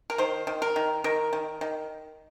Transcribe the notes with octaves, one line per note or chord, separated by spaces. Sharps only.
A#4
D#3 C5
D#3
A#4
D#3
D#3 A#4
D#3
D#3